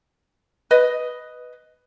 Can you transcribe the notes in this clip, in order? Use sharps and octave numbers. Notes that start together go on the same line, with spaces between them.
B4 D#5